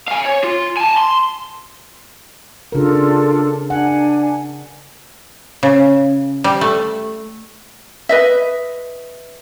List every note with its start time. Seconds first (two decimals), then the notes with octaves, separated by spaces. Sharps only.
0.08 F5 G#5
0.25 C#5
0.44 F4
0.77 G#5 A5
0.97 C6
2.72 C#3 D4 F4 A4 A#4
3.70 D4 F#5 G#5
5.63 C#3
6.44 G3
6.61 A3
8.09 B4 D#5 E5